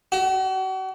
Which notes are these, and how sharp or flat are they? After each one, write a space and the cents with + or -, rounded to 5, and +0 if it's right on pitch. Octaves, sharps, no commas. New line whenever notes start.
F#4 +40